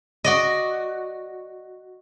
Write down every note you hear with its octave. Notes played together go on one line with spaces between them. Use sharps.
F#4 D5 D#5